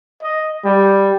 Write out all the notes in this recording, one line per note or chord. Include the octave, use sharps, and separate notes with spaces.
D#5
G3